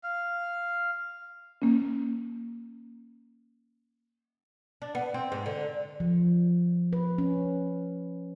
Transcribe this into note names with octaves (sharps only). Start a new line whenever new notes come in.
F5
A#3 C#4
D4
B3
C4
G#2
D3
F3
B4
C#4